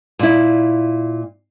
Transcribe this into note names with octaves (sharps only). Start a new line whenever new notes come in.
A#2 E4